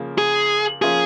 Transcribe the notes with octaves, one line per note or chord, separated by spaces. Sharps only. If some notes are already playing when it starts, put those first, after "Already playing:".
Already playing: C#3 F3 A#3
G#4
F3 A#3 C#4 F4 G#4